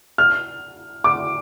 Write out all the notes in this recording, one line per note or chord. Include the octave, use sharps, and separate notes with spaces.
F6
D6